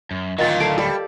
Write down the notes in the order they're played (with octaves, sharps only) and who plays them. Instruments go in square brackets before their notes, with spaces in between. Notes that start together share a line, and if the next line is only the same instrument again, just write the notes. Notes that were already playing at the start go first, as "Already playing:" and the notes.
[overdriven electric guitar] F#2
[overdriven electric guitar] D2 F#3 [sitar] A#2 D#3 F4 [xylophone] D#5 A6
[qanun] A4 A5 [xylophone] C7 D7
[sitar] G3 [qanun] G4 D5